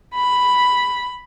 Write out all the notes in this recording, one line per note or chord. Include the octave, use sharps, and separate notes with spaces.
B5